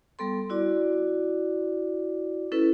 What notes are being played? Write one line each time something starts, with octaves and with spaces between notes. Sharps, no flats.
G3 B3 A4 C6
E4 F#4 D5 D6
C#4 E4 A4 B4